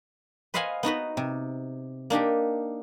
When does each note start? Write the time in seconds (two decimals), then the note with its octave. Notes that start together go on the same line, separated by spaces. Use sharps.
0.54 B4 C5 D#5 F5 F#5 G#5
0.83 B3 D#4 F#4 B4
1.17 C3
2.10 A#3 D4 D#4 G4